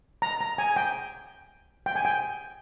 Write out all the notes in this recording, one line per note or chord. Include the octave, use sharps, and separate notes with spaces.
A#5
A#5
G#5
G5
G5
G#5
G5